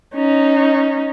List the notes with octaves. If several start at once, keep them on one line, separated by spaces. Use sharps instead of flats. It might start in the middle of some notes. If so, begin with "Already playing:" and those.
C#4 D#4